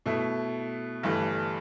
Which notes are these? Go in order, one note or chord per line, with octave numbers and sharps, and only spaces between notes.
B2 A3 E4
G1 G2 E3 A3